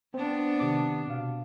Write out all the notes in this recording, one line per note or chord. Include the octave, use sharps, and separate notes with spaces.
B3 C4 D4 C5
C3 D#3 D6
B2 F5